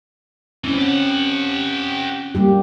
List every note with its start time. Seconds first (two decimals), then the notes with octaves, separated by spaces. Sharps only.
0.64 C2 E3 C4 C#4
0.78 G4 F#5
2.35 G3 A#3 G4